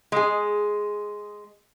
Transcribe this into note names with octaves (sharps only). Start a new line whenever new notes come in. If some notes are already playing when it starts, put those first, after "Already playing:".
G#3 G#4